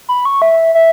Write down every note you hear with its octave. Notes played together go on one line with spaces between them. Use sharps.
B5
C#6
E5
E5